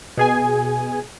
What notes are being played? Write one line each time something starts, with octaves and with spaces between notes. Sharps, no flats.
B2 G#4 G#5